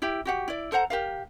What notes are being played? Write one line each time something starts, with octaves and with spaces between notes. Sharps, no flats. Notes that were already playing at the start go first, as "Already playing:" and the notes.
E4 G4
F#4 G4 F#5
E4 D5
A4 C5 F#5 A#5
G4 A#4 F5